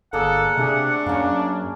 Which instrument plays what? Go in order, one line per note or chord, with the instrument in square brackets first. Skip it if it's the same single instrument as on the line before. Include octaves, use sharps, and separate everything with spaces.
[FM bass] G1 [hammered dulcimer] A#3 G#4 D5 [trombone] A4 [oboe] F#5
[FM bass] C3 [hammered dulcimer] A3 G#4 [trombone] D4
[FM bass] F#2 [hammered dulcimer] A#3 C#4